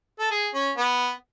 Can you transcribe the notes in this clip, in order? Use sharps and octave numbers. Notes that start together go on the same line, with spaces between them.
A4
G#4
C#4
B3